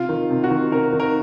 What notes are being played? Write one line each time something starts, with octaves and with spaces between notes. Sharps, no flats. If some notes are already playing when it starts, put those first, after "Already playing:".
Already playing: C3 F4
D#3
C3
F#4
D#3
C3 A#4
D#3
A#4